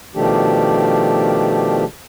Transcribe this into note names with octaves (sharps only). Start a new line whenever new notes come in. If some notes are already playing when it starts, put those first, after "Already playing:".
B2 D#3 F3 A3 D4 G4